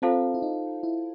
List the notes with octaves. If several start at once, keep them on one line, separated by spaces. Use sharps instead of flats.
C4 F4 A4 C5 F5 A5
E4
D#4
E4